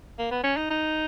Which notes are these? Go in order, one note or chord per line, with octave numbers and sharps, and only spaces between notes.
A#3
B3
C#4
D#4
D#4